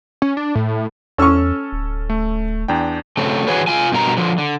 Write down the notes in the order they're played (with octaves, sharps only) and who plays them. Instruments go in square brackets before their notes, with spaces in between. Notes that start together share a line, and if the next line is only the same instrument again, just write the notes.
[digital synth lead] C#4
D4
A2
[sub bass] E2 [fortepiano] C#4 C#6 [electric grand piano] A4 E6 F6
[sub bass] D1
[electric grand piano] A3
E2 D4 G5
[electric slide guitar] C#3 A3 C4
D3 E3 F#4 G#4 B4 C#5
F4 G#5
G2 B2 A#4 A#5
D3 F3
D3